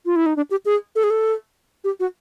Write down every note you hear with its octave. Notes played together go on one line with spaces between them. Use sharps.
F4
E4
D#4
D4
G4
G#4
A4
G#4
A4
G4
F#4